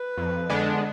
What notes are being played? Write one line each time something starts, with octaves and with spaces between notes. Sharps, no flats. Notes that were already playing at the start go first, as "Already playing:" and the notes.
Already playing: B4
F2
D3 G#3 B3 D4